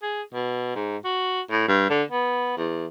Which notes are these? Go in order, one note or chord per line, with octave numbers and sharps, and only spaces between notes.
G#4
B2
G#2
F#4
A2
G2
D3
B3
E2